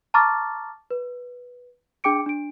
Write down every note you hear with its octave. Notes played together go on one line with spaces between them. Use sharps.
A5 A#5 C#6 D6 F6 A6
B4
D4 G#4 G5 D6 C#7 D7
D4 D7